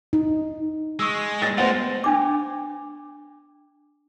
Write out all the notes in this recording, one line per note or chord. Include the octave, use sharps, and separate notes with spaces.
D#4
G#3 C#6 D#6 E6
A6 A#6
G#3 A3 B3 F4 B4 C5 F#5
C#4 D4 D6